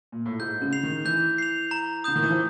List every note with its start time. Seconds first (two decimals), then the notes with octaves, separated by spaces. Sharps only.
0.12 A#2
0.26 A2
0.39 G#2 G6
0.62 C#3
0.73 C7 F7
0.83 D#3
1.05 E3 G6
1.38 C7 F7
1.71 A#5
2.04 D3 D#6 G6
2.16 D#3
2.23 E3
2.30 F3